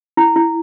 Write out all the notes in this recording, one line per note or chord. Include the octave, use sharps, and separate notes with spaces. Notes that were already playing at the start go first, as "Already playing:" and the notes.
E4
E4